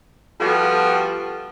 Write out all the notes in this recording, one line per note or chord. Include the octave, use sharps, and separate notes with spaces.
F3 G3 B3 F#4 G4 A4